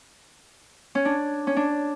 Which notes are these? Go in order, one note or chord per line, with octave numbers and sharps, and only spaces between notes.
C#4
D4
C#4
D4